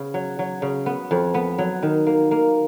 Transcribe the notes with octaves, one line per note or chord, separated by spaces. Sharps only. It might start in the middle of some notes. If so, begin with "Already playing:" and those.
Already playing: C#3 B3
F#3
F#3
C#3
B3
F2
B3
F#3
D#3
A#3
A#3